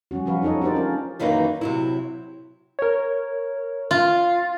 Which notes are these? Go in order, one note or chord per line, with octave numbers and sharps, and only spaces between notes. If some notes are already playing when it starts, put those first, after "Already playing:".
F#3 G3 C#4 F#4
F3 G3 F#4 B4 F5
D#4 F4 A4 C#5 D#5
D4 F4 G4 A#4 C5 D5
G#3 C#4 F4 A#4
F#2 D#3 E3 A#3 D#4 B4
C3 F#3 E4
A#4 C#5
F4